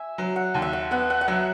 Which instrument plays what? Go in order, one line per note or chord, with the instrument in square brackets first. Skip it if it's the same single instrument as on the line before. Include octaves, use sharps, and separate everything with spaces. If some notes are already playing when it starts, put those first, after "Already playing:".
Already playing: [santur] E5 G#5
[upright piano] F#3
[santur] F#5
[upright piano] D#2
[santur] E5
F#5
[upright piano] B3 [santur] F#5
[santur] F#5
F#5
[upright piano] F#3 [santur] E5